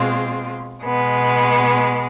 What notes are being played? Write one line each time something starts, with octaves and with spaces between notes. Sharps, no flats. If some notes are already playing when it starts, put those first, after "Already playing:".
Already playing: B2 G#3 C4 F4
B2 G#3 B3